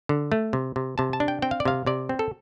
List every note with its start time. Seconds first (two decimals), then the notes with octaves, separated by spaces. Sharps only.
0.09 D3
0.32 A3
0.53 C3
0.76 C3
0.98 C3 A5
1.13 A5
1.20 D4
1.28 G5
1.42 C4 G5
1.51 F5
1.60 D5
1.65 C3 F5
1.86 C3 D5
2.09 C4
2.19 A4